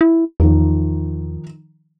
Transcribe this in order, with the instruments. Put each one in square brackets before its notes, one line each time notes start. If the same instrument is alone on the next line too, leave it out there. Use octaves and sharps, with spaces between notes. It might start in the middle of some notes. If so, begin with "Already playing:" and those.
[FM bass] E4
[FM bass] E2 [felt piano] D#3 F3 D#4